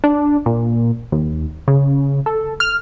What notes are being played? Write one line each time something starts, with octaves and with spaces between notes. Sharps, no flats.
D4
A#2
D#2
C#3
A4
F6